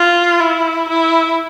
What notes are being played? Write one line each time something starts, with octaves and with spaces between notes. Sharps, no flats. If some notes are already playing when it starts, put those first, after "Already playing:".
Already playing: F4
E4
E4